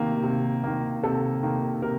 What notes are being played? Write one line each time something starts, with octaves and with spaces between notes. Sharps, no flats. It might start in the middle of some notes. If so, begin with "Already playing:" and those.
Already playing: C3 D#3 A#3
C3
D#3 A#3
C3 A4
D#3 A#3
C3 A#4